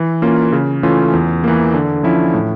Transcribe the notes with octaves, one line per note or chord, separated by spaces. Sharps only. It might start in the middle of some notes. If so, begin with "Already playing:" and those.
Already playing: E3
A#3 C#4 F4
C#3
E3 A3 C#4 F4
E2
E3 A#3
D3
F3 C#4 E4
A2